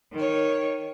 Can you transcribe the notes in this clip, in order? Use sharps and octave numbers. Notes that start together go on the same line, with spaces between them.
D#3 C#5